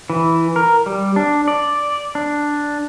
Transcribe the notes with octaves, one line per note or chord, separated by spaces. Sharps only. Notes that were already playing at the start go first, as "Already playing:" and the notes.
E3
A#4
G3
D4
D5
D4